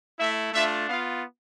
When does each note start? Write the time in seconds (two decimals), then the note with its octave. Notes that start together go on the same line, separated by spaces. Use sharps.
0.18 A3 E4 E5
0.53 A3 D4 F4 E5
0.88 B3 F4 F5